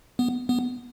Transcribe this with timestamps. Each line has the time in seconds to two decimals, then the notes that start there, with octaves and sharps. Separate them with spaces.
0.19 B3
0.49 B3